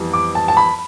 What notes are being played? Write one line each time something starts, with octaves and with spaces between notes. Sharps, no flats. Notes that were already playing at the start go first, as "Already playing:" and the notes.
Already playing: F2 E3 G3 B3
D6
A5
A5
B5